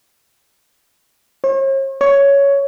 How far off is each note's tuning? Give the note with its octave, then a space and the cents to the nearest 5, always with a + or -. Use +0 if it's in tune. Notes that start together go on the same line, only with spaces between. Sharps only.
C#5 -45
C#5 +10